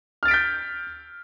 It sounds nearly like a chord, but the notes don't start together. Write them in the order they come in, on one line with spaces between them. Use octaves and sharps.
F6 A6 D7 B6 G6